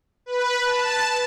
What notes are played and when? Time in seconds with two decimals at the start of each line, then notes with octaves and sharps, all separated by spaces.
0.26 B4
0.65 A5